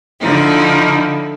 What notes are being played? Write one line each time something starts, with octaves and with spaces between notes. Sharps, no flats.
D3 F3 D#4 E4